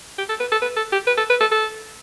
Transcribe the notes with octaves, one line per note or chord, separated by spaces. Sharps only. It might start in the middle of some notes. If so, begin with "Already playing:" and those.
G4
A4
B4
A4
B4
A4
G4
B4
A4
B4
A4
A4